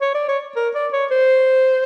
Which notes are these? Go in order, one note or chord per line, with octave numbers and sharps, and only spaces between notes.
C#5
D5
C#5
A#4
D5
C#5
C5